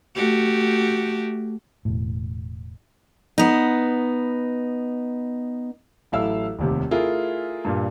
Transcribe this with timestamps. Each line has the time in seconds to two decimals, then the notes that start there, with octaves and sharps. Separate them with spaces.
0.16 A3 F#4 G4
1.85 E1 A2
3.38 B3 D#4
6.12 A1 F#3 E4 A4 F5 E6
6.59 F1 D#2 C3
6.91 A3 E4 F4 G#4 A#4
7.65 G2 A#2